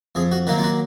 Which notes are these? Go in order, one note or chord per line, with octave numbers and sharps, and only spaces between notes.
F2 G#4
F#4
D#3 F#3 A#3 D#4 F#4
F4
F#4